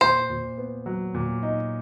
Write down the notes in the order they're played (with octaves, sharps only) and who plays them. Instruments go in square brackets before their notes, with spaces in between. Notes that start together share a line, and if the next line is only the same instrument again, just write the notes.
[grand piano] A#2 [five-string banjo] C5
[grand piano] A#2
B3
F#3
A#2
D#4